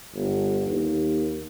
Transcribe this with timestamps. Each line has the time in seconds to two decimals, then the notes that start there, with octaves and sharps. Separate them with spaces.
0.14 G1
0.67 D#2